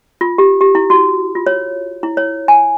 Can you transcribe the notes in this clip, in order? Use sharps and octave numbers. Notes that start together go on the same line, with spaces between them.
F4
G4
G4
E4
F#4
F4
C#5
E4
C#5
G#5